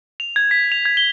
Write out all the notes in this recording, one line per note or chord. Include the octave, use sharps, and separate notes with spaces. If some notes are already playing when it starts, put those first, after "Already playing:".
F7
G#6
B6
F7
G#6
G7